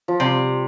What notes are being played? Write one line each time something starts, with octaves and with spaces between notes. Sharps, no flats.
F3
C3 G3